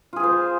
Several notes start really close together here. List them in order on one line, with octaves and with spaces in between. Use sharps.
F4 G#4 F5 C5